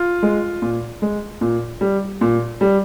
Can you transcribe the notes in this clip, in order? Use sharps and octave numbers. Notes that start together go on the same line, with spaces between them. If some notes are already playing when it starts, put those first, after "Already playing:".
Already playing: F4
G#3
A#2
G#3
A#2
G3
A#2
G3